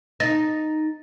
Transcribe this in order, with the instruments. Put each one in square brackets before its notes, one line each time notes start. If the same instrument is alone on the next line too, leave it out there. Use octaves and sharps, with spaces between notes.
[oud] D#4 [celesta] A6 A#6